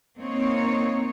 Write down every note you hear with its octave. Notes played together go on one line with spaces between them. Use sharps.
A#3 C4 D#4 C#5